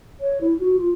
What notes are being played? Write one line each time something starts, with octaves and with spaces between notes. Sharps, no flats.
C#5
E4
F#4
F4